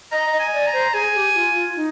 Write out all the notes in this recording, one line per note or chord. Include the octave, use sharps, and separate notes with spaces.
D#5 A#5
D#5
G#5
D5
A#5
C5
G#4 G#5
G4
F4
F4
D#4